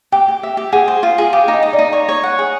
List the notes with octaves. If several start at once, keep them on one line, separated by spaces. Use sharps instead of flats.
G4 G5
G4
E5
G4
G#4 F#5
C5
F4
G#4
G4 F5
D#4
D#5
D#4
D5
D#4
C#5
C#5
F#5
G#4